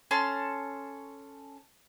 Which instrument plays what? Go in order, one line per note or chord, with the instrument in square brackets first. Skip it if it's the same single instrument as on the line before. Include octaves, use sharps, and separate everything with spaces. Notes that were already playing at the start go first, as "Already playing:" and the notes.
[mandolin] C#4 A4 A5 C6